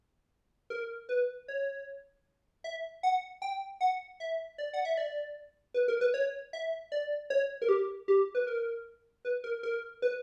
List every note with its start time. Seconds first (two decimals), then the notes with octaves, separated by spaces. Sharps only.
0.70 A#4
1.09 B4
1.48 C#5
2.64 E5
3.03 F#5
3.42 G5
3.81 F#5
4.20 E5
4.58 D5
4.73 F#5
4.85 E5
4.97 D5
5.74 B4
5.88 A#4
6.01 B4
6.14 C#5
6.53 E5
6.92 D5
7.30 C#5
7.62 A#4
7.69 G4
8.08 G4
8.35 B4
8.47 A#4
9.25 B4
9.44 A#4
9.63 A#4
10.02 B4